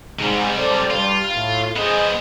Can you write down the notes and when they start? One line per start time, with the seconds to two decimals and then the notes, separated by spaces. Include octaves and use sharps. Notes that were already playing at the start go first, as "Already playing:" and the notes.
0.19 G#2 C3 G3
0.56 A4 C5 D5
0.90 G2 G3 F4
1.35 A2
1.76 B3 G#4 C5 D#5